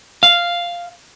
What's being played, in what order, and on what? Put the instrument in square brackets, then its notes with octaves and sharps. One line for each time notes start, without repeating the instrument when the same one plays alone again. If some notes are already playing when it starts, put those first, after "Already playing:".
[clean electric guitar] F5